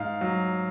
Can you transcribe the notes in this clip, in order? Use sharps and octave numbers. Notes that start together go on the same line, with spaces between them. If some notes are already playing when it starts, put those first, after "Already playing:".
Already playing: G#2 F5
F#3